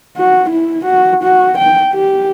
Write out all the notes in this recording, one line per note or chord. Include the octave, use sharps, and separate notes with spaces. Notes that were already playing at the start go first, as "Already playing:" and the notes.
F#4
E4
F#4
F#4
G5
G4